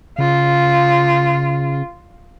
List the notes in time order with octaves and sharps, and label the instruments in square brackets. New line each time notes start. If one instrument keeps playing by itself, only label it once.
[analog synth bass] C#3 [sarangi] F4